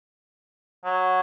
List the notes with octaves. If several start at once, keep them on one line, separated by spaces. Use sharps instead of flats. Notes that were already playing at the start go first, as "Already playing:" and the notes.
F#3